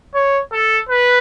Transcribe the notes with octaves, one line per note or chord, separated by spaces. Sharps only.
C#5
A4
B4